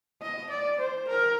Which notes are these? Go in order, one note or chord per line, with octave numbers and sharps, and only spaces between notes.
D#5
D5
C5
A#4